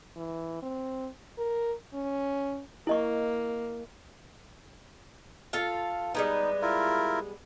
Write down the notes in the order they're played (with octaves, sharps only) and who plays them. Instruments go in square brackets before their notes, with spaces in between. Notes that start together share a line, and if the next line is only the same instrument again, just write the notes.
[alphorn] E3
C4
A#4
C#4
[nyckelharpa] A#3 [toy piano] E4 D#5 C#6
[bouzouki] F4 A4 F5
[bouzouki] G3 G#3 B3 [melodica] D#4
[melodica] E4 F4 A#4